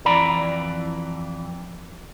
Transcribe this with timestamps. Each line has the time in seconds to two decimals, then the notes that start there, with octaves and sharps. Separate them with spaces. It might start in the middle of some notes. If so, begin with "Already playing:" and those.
0.05 F2 E3 D5 A#5 B5